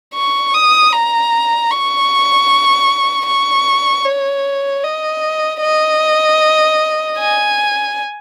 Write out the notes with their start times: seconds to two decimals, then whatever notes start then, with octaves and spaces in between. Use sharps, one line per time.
0.15 C#6
0.54 D#6
0.93 A#5
1.71 C#6
3.27 C#6
4.05 C#5
4.84 D#5
5.62 D#5
7.19 G#5